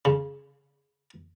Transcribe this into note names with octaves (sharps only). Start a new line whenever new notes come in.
C#3